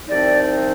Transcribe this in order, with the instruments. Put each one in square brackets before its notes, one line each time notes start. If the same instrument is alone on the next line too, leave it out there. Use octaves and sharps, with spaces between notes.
[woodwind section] C2 C3 F3 C4 D#4 D5